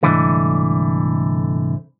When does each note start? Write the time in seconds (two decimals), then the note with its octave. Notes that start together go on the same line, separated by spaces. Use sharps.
0.03 C2 G#2 D3 E3 A3